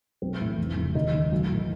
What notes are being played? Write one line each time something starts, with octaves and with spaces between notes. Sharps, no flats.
B1 C4
A2 E3
F1
F2 C#3 E3
D#2 D#4
D#3
B1
A2 E3